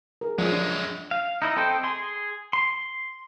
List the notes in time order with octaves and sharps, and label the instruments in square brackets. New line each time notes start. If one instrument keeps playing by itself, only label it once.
[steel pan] G#4 A#4
[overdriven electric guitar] F#2 G#3 [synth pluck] F3 [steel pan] F4 G#4 D5
[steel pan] D4
[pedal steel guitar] F5
D#4 E4 D#5
C4 A4 C5 D#5 G5
G#4 C6
C6